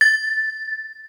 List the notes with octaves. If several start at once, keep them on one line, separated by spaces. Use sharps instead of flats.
A6